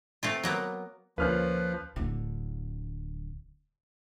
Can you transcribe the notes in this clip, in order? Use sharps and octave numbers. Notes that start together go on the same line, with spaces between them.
A3 C4 F4
F#3 A#3 B3
D2 F3 A#3 C#4 F4 B4 F6 F#6
D1 D3